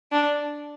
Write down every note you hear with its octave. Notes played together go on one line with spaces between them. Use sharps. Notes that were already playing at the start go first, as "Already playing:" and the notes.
D4